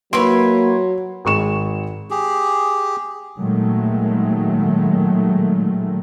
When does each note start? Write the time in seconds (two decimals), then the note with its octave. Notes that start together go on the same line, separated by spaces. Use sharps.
0.13 F#3 A#3 E4 B4 C#5 C6
1.25 G#1 G#3 C#6 E7
2.10 G4 G#4
3.37 A#2 D#3 F#3 G#3 A3